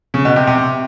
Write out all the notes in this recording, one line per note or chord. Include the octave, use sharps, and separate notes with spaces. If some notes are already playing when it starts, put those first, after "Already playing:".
C#3
B2
C3
C3